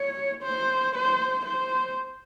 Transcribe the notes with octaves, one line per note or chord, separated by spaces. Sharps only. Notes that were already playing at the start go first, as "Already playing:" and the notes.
Already playing: C#5
C5
C5
C5